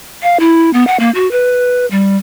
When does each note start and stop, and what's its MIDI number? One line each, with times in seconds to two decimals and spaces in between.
0.23 0.40 77
0.40 0.72 64
0.73 0.86 59
0.87 0.99 78
1.00 1.10 58
1.15 1.30 66
1.31 1.86 71
1.91 2.17 55